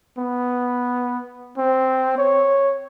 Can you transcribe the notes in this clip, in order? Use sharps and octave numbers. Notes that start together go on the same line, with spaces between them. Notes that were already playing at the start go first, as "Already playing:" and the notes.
B3
C4
C#5